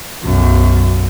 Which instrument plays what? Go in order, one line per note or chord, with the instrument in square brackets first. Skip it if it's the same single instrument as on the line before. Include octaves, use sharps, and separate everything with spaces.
[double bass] B1 F#2